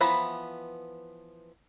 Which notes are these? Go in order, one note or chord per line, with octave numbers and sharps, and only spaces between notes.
E3 F3 B3 A#5 B5